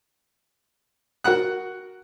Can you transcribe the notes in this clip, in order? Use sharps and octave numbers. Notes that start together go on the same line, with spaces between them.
F#4 A#4 F#5 F#6